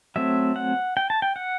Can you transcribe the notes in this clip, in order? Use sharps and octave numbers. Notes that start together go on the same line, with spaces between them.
F#3 A3 C4 E5
F#5
G5
A5
G5
F#5